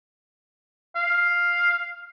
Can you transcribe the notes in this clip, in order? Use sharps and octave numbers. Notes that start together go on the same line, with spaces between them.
F5